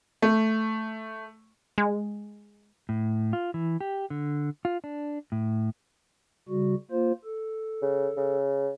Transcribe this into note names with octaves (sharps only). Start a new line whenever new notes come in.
A3
G#3
A2
F4
E3
G4
D3
F4
D4
A2
C#3 G3 F#4
A#3 F4 C5
A4
C#3
C#3